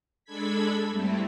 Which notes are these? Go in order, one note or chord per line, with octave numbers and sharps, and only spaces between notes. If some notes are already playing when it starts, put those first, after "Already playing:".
G#3 D4 A4 B5 G#6 B6
G2 G3 A3 C4 E4